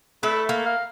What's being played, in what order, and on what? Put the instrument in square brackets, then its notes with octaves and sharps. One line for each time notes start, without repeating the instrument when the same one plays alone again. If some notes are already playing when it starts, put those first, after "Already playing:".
[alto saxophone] A3 [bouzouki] E4 B4
[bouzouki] A#3
[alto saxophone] F5